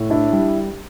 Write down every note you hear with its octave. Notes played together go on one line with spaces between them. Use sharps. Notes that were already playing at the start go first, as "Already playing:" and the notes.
Already playing: A2
D4 E4
G3